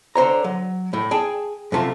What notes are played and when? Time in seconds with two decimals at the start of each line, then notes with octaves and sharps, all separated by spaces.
0.15 D3 C5 C#5 A#5
0.44 F#3
0.93 A2 A3
1.11 G#4 G5 A5
1.72 F#2 C3 A3 F4